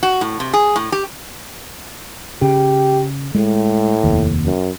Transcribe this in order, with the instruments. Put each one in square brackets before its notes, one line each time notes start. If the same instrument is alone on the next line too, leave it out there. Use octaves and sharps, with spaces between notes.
[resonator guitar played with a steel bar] F#4
A2
C3
G#4
A2
G4
[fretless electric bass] C#3 [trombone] G4
[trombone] A2 [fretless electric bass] G#3
[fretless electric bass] F1 D#2
[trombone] F#2